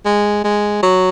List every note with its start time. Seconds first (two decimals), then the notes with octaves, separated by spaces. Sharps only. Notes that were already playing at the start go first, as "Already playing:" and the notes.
0.05 G#3
0.44 G#3
0.83 F#3